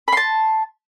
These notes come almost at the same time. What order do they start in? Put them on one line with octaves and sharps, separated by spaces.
B5 C6 A5